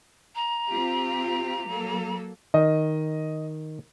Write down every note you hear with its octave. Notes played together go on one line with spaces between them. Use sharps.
A#5
C4 F4 G4
F#3 A#3 A4
D#3 D#5